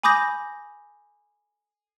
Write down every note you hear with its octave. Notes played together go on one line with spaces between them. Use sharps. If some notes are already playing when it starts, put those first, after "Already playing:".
G#5 B5 D6 D#6 G6 A#6